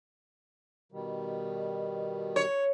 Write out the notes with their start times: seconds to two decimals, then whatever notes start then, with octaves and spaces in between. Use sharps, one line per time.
0.92 B2 D#3 G3
2.36 C#5